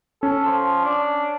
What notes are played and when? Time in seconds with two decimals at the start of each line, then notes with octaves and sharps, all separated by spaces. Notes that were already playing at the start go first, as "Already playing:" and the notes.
0.23 C#4 A4
0.45 F3
0.84 D4